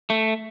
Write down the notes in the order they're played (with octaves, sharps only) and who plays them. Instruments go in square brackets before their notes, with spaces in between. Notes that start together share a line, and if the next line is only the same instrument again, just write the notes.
[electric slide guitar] A3